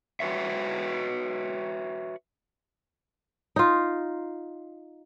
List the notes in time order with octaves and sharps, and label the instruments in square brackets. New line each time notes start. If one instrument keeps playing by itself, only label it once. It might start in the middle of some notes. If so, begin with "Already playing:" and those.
[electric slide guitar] F#4 B4 C#5 E5
[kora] D#4 F4